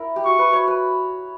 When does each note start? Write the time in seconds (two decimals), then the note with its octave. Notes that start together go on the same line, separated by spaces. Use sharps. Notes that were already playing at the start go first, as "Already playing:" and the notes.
Already playing: E4 A#4
0.16 G4
0.25 F#4 C#6
0.39 B4
0.53 C#5
0.68 B4